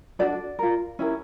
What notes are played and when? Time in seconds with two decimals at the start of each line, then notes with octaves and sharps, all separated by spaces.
0.19 D4 F#4 A4 D5
0.59 F4 A#4
0.99 C#4 E4 G4 A#4